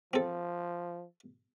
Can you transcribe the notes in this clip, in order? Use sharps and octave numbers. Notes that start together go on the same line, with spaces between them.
F3 C4 A4